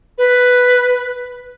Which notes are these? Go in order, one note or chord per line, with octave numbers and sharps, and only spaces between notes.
B4